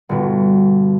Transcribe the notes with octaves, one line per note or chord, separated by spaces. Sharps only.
G1 B2